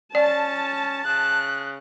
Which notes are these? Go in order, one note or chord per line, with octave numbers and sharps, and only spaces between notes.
C#4 D5 A5
C#3 F#6